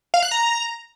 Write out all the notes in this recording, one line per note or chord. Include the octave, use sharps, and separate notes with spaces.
F5
F#6
A#5